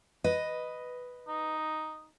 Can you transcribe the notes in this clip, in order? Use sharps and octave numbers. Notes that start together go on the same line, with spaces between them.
B4 D#5
D#4